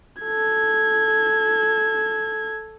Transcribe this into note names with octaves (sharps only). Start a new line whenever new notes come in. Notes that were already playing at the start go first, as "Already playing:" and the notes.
A4 G#6